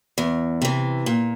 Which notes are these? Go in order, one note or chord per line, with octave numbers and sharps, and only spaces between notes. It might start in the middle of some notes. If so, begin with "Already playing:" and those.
E2
C3 E3
A#2